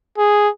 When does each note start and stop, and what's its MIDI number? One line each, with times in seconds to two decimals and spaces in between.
0.18 0.49 68